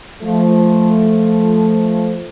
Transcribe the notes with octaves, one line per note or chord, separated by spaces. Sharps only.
F3 A3